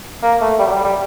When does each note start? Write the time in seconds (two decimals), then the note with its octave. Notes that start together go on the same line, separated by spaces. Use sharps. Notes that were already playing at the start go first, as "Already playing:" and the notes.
0.23 A#3
0.41 A3
0.59 G3
0.67 F#3
0.72 G3
0.85 G3